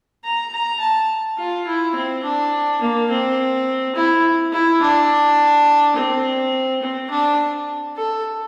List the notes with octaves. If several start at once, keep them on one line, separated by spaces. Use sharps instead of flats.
A#5
A#5
A5
F4
E4
C4
D4
A#3
C4
E4
E4
D4
C4
C4
D4
A4